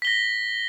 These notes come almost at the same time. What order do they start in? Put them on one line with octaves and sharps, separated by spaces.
B6 G7 A#6